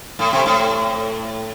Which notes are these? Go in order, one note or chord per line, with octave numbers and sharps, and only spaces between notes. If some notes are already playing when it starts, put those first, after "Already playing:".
A2
C3
A2